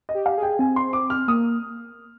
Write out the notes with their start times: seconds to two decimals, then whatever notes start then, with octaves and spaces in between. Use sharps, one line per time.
0.09 D#5
0.15 G4
0.26 F5
0.38 G#4
0.43 G5
0.59 C4 G#5
0.76 C6
0.93 D6
1.10 F6
1.28 A#3 D#6